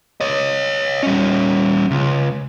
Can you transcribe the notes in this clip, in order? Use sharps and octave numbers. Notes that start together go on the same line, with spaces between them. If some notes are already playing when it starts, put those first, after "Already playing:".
C#5 D#5
G3 C#4
C#2